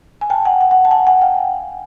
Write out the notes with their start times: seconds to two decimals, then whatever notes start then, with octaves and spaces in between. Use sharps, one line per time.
0.21 G#5
0.30 G5 A5
0.45 F#5 G#5
0.60 F#5 G#5
0.71 F#5 G#5
0.85 A5
0.91 F#5 G#5
1.07 F#5 G#5
1.22 F5 G5